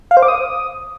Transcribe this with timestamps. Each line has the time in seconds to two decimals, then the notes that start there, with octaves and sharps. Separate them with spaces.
0.11 F5
0.17 C5
0.23 D6
0.28 D#6